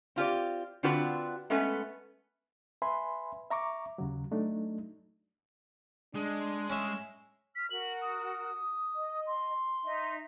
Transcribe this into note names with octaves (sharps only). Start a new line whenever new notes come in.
C4 F4 G4 D5
D3 C4 D4 F4 F#4 B4
G#3 A3 B3 C#4 B4
B4 E5 G#5 B5 C6
E5 A#5 C#6 D6
D#2 C#3 F#3
F#3 A3 D4 D#4
G#3 D4
C#4 E5
F6 B6
F#4 A#4 F#7
D#6
D#5
C6
D#4 E5